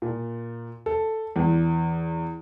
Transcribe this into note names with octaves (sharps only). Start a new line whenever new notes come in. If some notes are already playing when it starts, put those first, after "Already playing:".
A#2
A4
E2